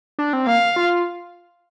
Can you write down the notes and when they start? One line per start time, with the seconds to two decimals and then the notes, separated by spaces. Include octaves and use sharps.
0.19 D4
0.33 C4
0.47 A#3 F5
0.76 F4